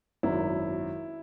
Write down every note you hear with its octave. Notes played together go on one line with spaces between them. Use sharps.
G#1 F#2 D#3 E4